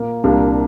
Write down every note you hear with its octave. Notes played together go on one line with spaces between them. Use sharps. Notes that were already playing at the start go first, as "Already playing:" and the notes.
Already playing: A#2 A#3
C2 A#2 G3 A#3 D4